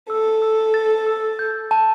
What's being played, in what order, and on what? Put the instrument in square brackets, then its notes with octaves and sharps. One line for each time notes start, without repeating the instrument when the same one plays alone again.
[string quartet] A4 [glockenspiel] E6
[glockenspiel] E6
A6
E6
G6
A5